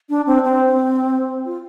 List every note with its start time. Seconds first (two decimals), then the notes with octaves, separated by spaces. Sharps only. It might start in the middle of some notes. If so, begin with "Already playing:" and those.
0.10 D4
0.27 C4
0.44 C4
1.46 F4